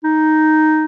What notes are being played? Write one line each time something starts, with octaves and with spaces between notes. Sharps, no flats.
D#4